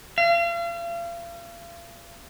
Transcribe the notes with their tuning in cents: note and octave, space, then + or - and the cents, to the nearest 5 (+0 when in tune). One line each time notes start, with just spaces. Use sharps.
F5 -40